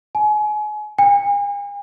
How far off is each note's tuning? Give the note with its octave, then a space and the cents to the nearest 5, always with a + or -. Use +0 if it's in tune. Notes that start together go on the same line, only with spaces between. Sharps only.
G#5 +30
G#5 -45